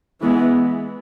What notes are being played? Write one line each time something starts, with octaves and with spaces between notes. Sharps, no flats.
E3 G#3 B3